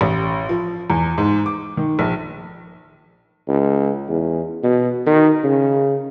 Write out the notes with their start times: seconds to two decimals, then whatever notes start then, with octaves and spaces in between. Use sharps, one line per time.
0.01 A1
0.49 F3
0.90 E2
1.18 G#2
1.46 D6
1.77 D#3
1.99 A#1
3.48 C#2
4.09 E2
4.63 B2
5.06 D#3
5.44 C#3